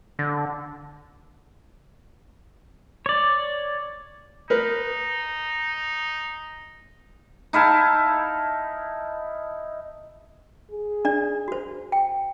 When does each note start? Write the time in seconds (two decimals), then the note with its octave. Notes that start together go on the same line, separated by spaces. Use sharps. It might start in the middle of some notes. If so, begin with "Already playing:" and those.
0.19 D3
3.06 C#5 D5
4.50 D#4 A#4 B4
7.53 D#4 E4 F5 A5
10.71 G#4
11.05 D4 D5
11.48 F#4 C5
11.92 G5